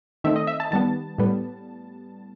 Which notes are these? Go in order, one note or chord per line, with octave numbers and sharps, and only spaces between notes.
D#3 A3 C4 E5
D#5
E5
A5
D#3 G3 B3 A5
A2 G3 B3